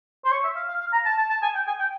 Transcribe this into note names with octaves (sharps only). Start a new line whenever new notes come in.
C5
C#5
E5
F5
F5
F5
A#5
A5
A5
A5
G#5
G5
G#5
G5